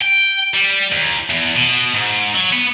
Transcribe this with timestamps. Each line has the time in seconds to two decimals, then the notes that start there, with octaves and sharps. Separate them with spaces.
0.02 G5
0.54 G3
0.92 D#2
1.30 E2
1.56 B2
1.94 G#2
2.35 F#3
2.53 B3